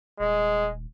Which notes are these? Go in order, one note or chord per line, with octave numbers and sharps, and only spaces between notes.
D#1 G#3